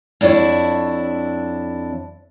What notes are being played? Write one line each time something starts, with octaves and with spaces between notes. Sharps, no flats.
F2 D4 E4 A4 C#5